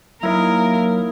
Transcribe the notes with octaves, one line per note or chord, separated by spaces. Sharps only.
F#3 A#3 D#4 E4 A#4